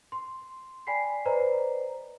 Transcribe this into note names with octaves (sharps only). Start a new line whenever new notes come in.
C6
D5 G5 G#5 B5 B6 C7
B4 C5 D5 D#5 A#5